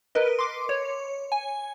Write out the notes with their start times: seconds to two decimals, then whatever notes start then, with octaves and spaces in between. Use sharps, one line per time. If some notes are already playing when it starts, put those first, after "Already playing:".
0.15 A#4 B4 D#5
0.39 C6 D6
0.69 C#5
1.32 G#5